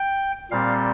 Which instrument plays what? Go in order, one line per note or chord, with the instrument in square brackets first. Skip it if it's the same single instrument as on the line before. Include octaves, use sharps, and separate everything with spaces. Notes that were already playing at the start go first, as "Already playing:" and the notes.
Already playing: [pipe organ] G5
A#2 G3 C4 F5